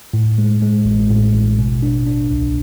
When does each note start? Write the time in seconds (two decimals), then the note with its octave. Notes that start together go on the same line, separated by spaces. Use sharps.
0.14 A2
0.38 G#3
0.62 G#3
0.85 A1
1.10 A2
1.34 A1
1.59 B2
1.83 D4
2.06 D4
2.31 C2